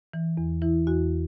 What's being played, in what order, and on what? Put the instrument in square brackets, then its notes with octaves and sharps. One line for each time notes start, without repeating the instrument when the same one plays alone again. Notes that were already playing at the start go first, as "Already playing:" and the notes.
[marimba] E3
E2
E3 E4
E2 F#4